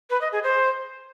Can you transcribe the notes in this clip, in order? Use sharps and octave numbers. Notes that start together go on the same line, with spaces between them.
B4
D#5
G#4
C5